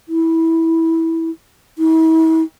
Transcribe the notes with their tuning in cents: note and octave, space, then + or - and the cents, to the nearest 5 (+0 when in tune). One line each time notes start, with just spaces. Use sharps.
E4 -15
E4 -40